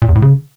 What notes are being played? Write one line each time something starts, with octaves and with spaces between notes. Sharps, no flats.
A#2
E2
A2
C#3